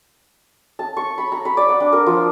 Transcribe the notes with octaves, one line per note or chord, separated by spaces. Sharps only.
A5
C#6
B5
A#5
B5
D5
F#5
D4
A#4
F3